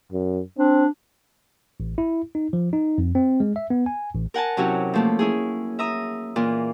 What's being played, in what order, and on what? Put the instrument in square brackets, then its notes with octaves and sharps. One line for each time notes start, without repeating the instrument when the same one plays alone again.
[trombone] F#2
[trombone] C4 [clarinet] D4
[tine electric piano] A1
E4
D#4
F3
D#4
F2
C4
G#3
E5
B3
G#5
A1
[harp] A#4 F#5 G#5 A5
C3 F#3 C#4 E4 F#4
F3 A3 A#3
C#4 E4 G#4
E5 A#5 D#6
A#2 E3 A#3 F4